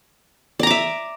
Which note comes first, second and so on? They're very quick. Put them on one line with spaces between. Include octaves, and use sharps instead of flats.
D5 A#5 D6 E5